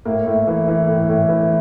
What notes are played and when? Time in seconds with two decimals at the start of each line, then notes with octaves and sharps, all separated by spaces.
0.05 A2 A#3
0.27 A2
0.47 E3
0.68 E3
0.88 A2
1.09 A2
1.29 E3